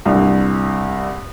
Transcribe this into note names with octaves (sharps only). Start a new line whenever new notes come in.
C2 G2